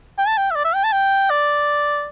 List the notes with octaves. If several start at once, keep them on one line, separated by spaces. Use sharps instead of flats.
G5
A5
G5
E5
D5
E5
G5
A5
G5
D5